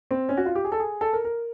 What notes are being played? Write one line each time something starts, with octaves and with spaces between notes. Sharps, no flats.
C4
C#4
F#4
F4
G4
G#4
A4
G#4
A4
A#4
A#4